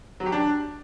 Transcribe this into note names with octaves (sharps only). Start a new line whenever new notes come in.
F#3
G4
D4